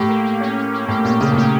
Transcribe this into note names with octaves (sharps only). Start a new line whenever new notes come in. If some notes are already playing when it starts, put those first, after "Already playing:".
Already playing: A2 G4
A#3
A#3
C#4
C#4
A#3
A2 G4
A#2 G4
C#3 G4
A2
A#2 C#4